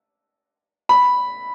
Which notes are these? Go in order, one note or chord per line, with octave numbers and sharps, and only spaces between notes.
B5